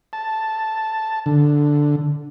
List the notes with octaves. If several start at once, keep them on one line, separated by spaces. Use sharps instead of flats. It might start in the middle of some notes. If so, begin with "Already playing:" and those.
A5
D3